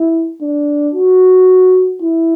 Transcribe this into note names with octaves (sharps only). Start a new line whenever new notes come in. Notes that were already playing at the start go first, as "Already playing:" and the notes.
Already playing: E4
D4
F#4
E4